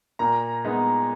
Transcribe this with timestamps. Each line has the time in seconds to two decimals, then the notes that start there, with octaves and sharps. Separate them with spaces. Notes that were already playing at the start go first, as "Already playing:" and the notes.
0.19 A#2 A#5
0.64 G#3 B3 D#4